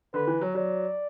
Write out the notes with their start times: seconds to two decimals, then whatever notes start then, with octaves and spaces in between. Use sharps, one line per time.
0.14 D3 B4
0.27 E3
0.41 F#3
0.55 F#3 D5